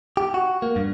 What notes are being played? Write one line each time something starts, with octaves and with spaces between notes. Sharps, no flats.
G4
F#4
A#3
G2